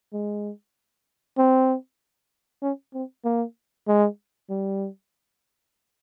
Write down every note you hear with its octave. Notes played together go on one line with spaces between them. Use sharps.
G#3
C4
C#4
C4
A#3
G#3
G3